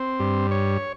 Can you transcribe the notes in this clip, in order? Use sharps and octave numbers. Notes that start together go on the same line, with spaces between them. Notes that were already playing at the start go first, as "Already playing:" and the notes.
Already playing: C4
G2
C#5